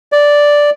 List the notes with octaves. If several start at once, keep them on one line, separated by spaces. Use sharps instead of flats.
D5